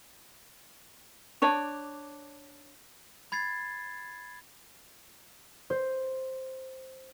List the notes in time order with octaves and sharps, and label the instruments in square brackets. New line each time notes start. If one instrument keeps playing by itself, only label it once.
[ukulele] D4 C#5 D5 [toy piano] A5 C#6
[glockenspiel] B5 G#6 A6 C7
[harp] C5